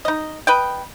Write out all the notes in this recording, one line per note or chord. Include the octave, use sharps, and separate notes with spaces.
D#4 D#5
B4 D#5 G5